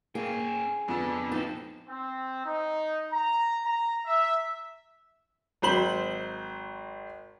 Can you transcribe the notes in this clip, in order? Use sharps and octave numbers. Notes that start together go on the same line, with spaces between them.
A#3 C#4 G#4 G5
C5
F2 B3 D4 A4
F3 B3 C4 D#4 F#4 A4
C4
D#4
A#5
A#5
E5
G#1 F#3 C5 B5 F#7